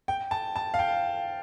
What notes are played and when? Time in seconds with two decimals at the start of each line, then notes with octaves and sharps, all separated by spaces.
0.08 G5
0.31 A5
0.56 A5
0.74 F5
0.79 G5